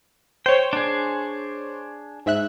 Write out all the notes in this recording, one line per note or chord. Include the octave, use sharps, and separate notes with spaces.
C5 C#5 G5
D4 G#4
G#2 E5 F#6